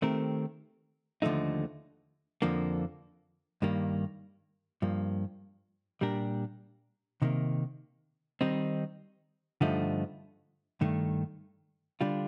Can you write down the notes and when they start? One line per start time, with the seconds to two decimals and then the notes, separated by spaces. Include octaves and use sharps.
0.02 D#3 A3 C4 G4 A#4
1.22 D#2 D3 F3 A3 D#4
2.42 F2 D3 F3 A#3
3.62 G2 D#3 G3 A#3
4.82 G2 F3 A#3
6.01 A#2 G3 D4 G4 A#4
7.22 C3 D#3 A#3
8.41 D#3 G3 C4 D#4
9.61 G2 D3 F3 A3 D#4
10.81 G2 D#3 A3
12.01 D3 G3 D4 F4